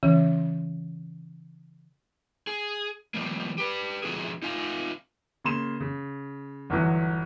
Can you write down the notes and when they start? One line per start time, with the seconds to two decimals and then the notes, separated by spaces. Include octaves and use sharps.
0.03 C#3 E3 C#4
2.47 G#4
3.14 F3 G3 A#3
3.58 G4 B4
4.03 D3 F3 D4 F#4 G#4
4.42 D#4 F4 F5 G#5
5.44 C#3 A#3 C6 E7
5.80 C#3
6.70 G1 E2 E3 F#3